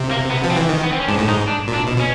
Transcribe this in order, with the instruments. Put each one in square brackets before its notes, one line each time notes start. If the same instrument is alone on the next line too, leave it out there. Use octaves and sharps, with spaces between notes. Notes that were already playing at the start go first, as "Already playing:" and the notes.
Already playing: [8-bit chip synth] C3
[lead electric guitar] A#3
B3
[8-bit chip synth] F3
[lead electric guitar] C4
[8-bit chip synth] E3
D#3
[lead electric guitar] B3
C4
C#4
[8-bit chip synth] G#2 [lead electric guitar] D4
[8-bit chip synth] A2
[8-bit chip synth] G#2 [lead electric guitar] D#4
[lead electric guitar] D4
[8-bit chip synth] A#2
[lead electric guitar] D4
[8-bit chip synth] B2
[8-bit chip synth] B2 [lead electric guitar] C#4